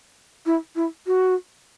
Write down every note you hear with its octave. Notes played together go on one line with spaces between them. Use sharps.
E4
E4
F#4